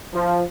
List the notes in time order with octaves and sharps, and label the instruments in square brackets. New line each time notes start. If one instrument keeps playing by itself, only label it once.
[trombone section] F3